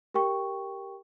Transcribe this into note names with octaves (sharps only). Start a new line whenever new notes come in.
G4 A#4 G5 C#6